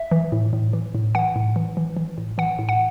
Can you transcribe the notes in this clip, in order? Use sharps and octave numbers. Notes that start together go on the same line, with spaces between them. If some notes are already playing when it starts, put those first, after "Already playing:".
Already playing: E5
E3
A2
A2
E3
A2
E3 F#5
A2
E3
E3
E3
A2
E3 F#5
A2
F#5